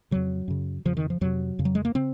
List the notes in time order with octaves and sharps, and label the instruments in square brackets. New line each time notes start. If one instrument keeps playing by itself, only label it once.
[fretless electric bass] F2 C#3 F#3
F#2 C#3
F2 C#3 F3
D#3
F3
F2 C3 F#3
F2 C#3
F#3
G#3
A#3
C#3 C4